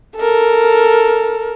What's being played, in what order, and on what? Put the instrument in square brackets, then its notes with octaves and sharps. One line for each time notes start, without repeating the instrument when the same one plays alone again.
[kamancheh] A4 A#4